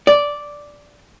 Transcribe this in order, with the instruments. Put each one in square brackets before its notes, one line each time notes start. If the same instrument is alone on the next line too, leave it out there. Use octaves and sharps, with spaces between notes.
[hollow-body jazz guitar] D5